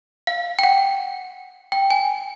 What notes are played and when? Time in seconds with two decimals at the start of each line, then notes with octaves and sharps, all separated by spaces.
0.27 F5
0.59 G5
0.63 F#5
1.72 G5
1.90 G#5